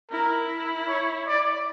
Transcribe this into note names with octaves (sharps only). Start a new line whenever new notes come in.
E4 A#4
C#5
D5